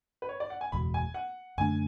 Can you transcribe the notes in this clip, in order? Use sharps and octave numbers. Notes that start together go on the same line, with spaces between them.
B4
C#5
D5
F#5
G#5
F#1 E2 B2 G#3 B5
G#5
F#5
F#2 D3 A3 D4 G#5